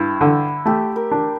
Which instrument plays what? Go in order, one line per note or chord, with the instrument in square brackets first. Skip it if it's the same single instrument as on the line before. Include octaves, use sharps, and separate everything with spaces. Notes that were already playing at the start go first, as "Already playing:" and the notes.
Already playing: [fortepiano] G2 [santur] E4
[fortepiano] D3
[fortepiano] A3 [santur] G4
[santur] A#4
[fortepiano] D4